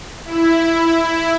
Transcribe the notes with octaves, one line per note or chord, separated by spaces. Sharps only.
E4
E4